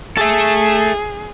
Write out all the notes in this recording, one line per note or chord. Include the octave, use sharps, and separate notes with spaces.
G#4 A4 E5